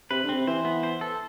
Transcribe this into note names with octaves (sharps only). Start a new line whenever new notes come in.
C3 B4
D3
C4
C3
E3 C5
B3
C5
A4